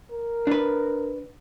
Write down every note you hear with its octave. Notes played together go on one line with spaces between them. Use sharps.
A#4
D4 B4